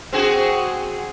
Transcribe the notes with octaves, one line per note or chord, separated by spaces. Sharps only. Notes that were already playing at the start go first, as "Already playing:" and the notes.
C4 F#4 G#4